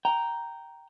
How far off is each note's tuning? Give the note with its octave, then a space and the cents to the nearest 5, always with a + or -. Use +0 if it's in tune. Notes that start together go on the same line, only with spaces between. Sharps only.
G5 -10 A#5 +0